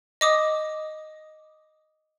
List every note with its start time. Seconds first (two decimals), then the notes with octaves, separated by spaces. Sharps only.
0.21 D#5 D6 D#6